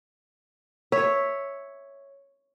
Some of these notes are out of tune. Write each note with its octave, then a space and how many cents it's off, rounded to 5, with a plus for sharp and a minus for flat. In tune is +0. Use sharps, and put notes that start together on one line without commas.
C#5 +0 E5 +0